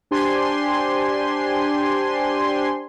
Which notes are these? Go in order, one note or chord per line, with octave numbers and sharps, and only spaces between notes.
D4 G4 C5 G#5 C6